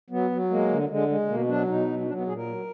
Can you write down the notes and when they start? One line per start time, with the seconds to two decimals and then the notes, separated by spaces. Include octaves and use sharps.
0.10 F#3 B3
0.31 F#3
0.50 G#3 A#3
0.69 D3
0.89 D3 G#3
1.09 G#3
1.28 B2 A#3
1.48 F#3 D4
1.68 B2 D#4
1.87 F#3
2.02 D#4
2.06 F#3 D4
2.16 B3
2.26 A#2 G#4
2.36 A#4
2.46 F#3